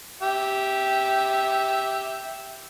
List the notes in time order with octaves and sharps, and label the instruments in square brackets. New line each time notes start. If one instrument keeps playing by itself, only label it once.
[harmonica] G4 E5